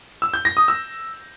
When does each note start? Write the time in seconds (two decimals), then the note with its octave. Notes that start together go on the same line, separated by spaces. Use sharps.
0.22 E6
0.34 G6
0.45 A#6
0.57 D#6
0.68 E6